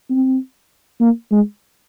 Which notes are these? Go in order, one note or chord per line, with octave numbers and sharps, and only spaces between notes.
C4
A#3
G#3